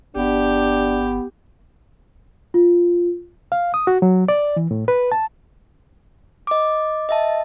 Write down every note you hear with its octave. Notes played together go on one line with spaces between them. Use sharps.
G1 B3 D4 G4
F4
F5
D#6
F#4
F#3
D5
E3
A2
B4
A5
D#5 D6
D#5 E5 A5